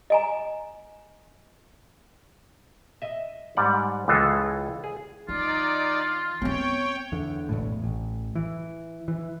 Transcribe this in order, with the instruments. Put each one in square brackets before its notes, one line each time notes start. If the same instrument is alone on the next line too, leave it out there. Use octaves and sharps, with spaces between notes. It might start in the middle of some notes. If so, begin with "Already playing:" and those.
[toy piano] D#5 G#5 A#5
[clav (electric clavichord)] D#5 E5
G#2 G3 D5 F#5
C#2 E3 G#3 F4 A4
G#4
[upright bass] E3 [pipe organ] D#4 D5 [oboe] F4
[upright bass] B3 C4 [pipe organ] C#5 G5
[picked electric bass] E2 D3
E1 A1 A2
A1
E3
E3